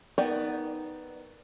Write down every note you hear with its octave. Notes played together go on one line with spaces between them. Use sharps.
B3 D#4 A#4 D5 G5